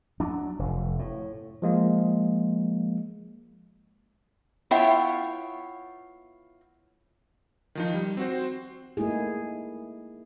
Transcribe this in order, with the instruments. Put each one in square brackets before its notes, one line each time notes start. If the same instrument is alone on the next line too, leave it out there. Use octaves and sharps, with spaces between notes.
[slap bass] F#3 D4
F1
A2
[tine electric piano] F3 G#3 A#3
[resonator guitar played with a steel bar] B3 E4 F4 C#5 E5 G5
[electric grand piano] D#3 F3 D#4
G3
C4 F#4 C5
[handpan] A3 A#3 D#4 E4 G#4